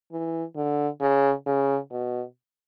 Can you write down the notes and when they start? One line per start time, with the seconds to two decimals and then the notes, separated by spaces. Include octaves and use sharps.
0.12 E3
0.56 D3
1.01 C#3
1.46 C#3
1.91 B2